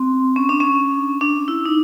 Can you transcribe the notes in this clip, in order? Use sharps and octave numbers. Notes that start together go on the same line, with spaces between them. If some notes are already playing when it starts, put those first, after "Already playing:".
Already playing: C4
C#4
D4
C#4
D4
E4
D#4